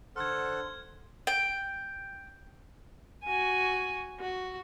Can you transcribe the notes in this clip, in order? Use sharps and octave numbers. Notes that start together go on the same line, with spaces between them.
D3 A4 C5 F#5 C6 F6 G#6
G5
F#4 G#5
F#4